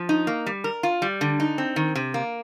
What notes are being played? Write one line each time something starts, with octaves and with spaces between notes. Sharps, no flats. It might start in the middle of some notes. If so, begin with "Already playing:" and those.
Already playing: F3
D#4
A#3
G3
A#4
F4
G3
D3
D#4
C4
D#3
C3
A#3